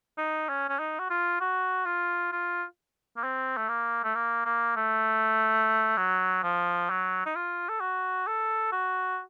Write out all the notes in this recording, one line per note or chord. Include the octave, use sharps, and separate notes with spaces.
D#4
C#4
C#4
D#4
F#4
F4
F#4
F4
F4
A#3
C4
A3
A#3
A3
A#3
A#3
A3
F#3
F3
F#3
D#4
F4
A4
F#4
A4
F#4